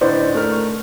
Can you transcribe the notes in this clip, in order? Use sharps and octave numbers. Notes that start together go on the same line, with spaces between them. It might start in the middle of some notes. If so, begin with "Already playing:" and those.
A2 D3 D#4 B4 C5 D5
A3 A#4 F6
C#6